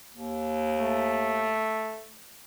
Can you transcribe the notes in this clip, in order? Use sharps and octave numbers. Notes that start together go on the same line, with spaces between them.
D#2
A3